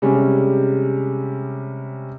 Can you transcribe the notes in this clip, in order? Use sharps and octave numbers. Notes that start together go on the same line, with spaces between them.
C3 G3 G#3 C#4